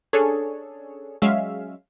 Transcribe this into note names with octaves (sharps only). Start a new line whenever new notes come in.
C#4 D4 G#4 A4 C#5
F#3 G#3 C#4 E5 F5